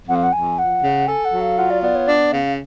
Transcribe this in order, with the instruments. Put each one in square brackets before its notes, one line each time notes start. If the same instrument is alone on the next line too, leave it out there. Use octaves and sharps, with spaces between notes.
[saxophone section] F2 [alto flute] F#5
[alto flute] F5
F#5
[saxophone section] F2 [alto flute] G#5
[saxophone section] F3 [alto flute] F#5
[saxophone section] C#3
[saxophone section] A4 [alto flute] G#5
[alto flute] F#5
[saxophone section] F#3
[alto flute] F5
[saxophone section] F4 [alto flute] F#5
[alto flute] D5
[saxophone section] B3 [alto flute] D5
[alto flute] C#5
[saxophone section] D4 [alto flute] D5
[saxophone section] C#3 [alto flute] F5